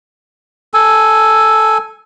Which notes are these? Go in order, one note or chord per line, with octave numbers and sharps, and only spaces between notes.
A4 G#5